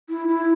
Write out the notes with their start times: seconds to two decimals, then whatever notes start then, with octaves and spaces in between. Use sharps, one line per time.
0.09 E4
0.28 E4